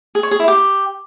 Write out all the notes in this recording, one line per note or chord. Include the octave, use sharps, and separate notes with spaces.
G#4
C#5
G#4
E4
G4